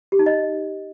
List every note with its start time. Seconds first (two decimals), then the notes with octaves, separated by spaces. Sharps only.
0.12 G4
0.19 D#4
0.26 D#5